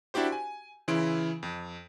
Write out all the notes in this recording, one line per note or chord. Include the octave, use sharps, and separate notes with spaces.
D4 E4 F#4 G4 C5
G#5
C#3 E3 E4 C6 D7
F2